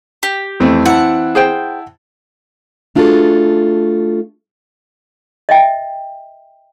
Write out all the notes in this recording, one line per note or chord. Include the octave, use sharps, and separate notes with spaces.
G4
F2 E3 A3 C4
E4 F#5 A5
G#4 C5 G5
A3 D4 F4 F#4 G#4 A4
D#5 E5 G5